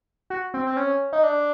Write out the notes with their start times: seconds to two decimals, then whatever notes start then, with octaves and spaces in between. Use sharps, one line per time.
0.30 F#4
0.54 C4
0.67 C4
0.77 C#4
1.12 D#4
1.23 D4